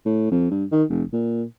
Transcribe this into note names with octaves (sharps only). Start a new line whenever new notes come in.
A2
F2
G2
D#3
F1
A#2